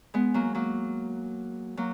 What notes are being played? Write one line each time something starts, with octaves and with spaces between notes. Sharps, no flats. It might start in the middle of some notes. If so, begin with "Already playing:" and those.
G#3 B3
F#3 A#3
F#3 A#3
F#3 A#3